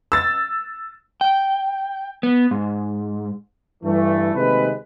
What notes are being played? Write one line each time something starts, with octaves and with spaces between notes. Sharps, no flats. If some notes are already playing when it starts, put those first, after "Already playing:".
E6 A6
G5
B3
G#2
G2 E3 A3
D#2 C3 G#3 A3 C4 B4